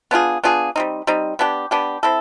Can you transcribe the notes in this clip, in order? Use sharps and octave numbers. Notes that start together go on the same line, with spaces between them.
B3 D4 F4 G#4
B3 D4 F4 G#4
G3 C4 D#4
G3 C4 D#4
B3 D4 G4
B3 D4 G4
C4 E4 A4